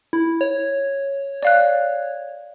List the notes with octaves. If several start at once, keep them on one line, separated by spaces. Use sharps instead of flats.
E4
C#5
D5 F5 F#6